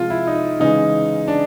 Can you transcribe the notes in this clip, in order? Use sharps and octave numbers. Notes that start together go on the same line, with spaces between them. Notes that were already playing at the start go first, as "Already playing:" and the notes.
Already playing: C3 F3 G#3 F4
E4
D#4
C#3 E3 G#3 D#4
D4